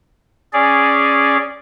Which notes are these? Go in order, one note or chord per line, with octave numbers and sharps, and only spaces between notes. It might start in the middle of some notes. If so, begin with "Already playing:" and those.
C#4 G#4 D5